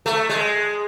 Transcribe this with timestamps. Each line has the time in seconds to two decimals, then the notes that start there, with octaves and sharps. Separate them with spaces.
0.06 A3
0.29 G#3